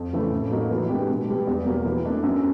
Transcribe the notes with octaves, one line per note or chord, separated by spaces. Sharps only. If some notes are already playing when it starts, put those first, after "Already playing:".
Already playing: F2
C#3 E3 A3
A2
F#3 A#3 D#4
E3
G#3 B3 D4 G4
B2
G3 B3
E2
B2 F#3 A#3
E3
A3 D4
F#2